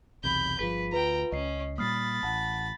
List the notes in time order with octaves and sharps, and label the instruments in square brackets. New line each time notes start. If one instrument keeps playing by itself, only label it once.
[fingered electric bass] B1 E2 C3 [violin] B5 G6
[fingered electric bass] G1 F3 [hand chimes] F4 G#4 B6 [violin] B4
[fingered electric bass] D2 [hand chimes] F4 B4 [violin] G5 A#5
[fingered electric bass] C#2 [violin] C#4 [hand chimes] D#5 C7
[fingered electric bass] A#2 G3 A#3 [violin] B5 A6 [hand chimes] D#6 F6 C7
[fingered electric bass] A1 [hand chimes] F#5 A5